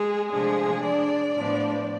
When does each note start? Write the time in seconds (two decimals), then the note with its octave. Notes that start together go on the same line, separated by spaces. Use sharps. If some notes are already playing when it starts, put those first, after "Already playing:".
Already playing: G#3 G#4
0.32 C3 F3 G#3 A3 D4 G#4
0.84 D4 D5
1.37 A2 F3 B3 D4